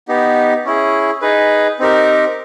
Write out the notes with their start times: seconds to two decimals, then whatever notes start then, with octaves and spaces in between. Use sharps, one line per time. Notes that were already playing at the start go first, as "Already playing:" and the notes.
0.08 B3 D#4 G4
0.65 C#4 E4 G#4
1.22 D#4 G#4 B4
1.79 C4 D#4 G4 A#4